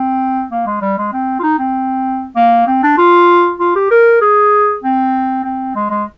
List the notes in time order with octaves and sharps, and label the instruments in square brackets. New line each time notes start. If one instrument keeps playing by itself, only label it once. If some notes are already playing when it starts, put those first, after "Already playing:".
Already playing: [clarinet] C4
A#3
G#3
G3
G#3
C4
F4
D#4
C4
A#3
C4
D4
F4
F4
G4
A#4
G#4
C4
C4
G#3
G#3